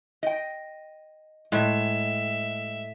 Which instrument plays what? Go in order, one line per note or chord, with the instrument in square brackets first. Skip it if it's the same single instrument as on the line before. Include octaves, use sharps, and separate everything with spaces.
[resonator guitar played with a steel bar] D#5 G5
[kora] A2 [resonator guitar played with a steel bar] G#3 [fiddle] E5